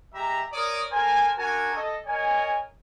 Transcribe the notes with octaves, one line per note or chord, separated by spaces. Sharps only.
G#3 G4 E5 A#5
A#4 C#5 D5 D#6
A4 A#4 C5 G#5
D4 F#4 A#4 G#5 A#5 C#6
A4 D#5
A#4 C#5 D#5 G#5